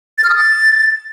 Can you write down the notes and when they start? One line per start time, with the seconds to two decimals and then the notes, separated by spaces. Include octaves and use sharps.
0.18 A6
0.24 F6
0.30 D#6
0.35 A6